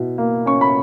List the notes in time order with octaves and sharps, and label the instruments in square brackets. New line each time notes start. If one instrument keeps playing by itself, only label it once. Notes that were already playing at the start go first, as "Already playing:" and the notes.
Already playing: [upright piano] B2 E4
A#3
C#4 C#6
B5